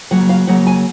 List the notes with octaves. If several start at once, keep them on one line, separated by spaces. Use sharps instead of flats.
C#3 F#3 A#3 F#5
F5
C#3 F#3 A#3 F#5
G#5